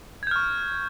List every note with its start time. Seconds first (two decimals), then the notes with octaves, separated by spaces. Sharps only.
0.23 G#6
0.27 G6
0.31 F6
0.36 C#6